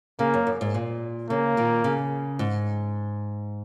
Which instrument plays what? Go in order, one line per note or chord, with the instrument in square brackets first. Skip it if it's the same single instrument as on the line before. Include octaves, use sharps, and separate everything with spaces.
[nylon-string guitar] C#3 [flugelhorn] A#3
[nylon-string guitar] F#2
F#2
G#2
A#2
[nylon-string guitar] C#3 [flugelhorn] A#3
[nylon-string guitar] A#2 D#3
C#3
G#2